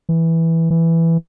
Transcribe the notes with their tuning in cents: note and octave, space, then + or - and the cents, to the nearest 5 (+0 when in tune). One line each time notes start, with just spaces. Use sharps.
E3 -5
E3 +5